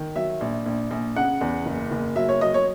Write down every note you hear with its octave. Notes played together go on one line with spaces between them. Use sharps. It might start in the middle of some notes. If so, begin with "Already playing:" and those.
Already playing: D#3
F#3 E5
A#1
A#1
A#1
C#3 F#5
E2
F#1
F#1
F#3 E5
C#5
F#3 D#5
C#5